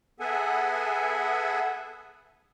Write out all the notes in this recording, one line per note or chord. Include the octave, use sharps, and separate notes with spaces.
B3 G#4 A4 E5 F#5 G#5